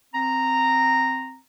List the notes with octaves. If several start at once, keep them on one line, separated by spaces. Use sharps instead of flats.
C4 A#5